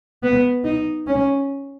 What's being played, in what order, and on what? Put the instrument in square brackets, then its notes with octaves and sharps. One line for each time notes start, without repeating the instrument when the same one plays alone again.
[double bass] B3
D#4
C#4